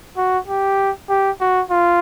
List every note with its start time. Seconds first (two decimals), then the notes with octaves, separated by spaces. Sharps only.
0.17 F#4
0.48 G4
1.09 G4
1.41 F#4
1.71 F4